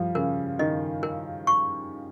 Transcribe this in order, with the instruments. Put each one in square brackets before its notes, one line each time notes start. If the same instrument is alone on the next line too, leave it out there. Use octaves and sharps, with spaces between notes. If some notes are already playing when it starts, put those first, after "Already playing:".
Already playing: [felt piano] F3 G3
[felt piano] C#3 [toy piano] A#4
[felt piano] D#3 [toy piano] D#5
[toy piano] A#4
C#6